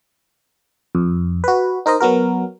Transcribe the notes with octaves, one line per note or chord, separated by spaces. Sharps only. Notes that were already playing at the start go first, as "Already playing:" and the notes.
F2
F#4 B4
D#4 A#4 C5 D#5
F#3 B3 F#4 A#4